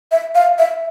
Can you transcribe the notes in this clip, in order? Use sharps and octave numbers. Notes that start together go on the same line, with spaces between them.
E5
F5
E5